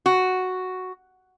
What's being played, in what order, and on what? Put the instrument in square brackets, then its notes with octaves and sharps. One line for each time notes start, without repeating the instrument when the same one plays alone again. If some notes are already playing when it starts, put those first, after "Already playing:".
[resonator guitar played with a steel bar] F#4